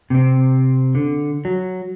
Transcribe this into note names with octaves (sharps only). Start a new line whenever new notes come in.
C3 C4
D3
F#3